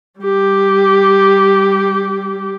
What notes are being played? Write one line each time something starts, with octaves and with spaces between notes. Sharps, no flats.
G3 G4